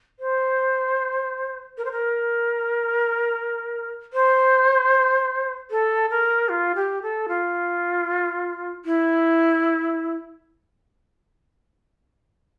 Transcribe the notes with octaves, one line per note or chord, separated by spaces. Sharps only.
C5
A#4
C5
A#4
C5
A4
A#4
F4
G4
A4
F4
E4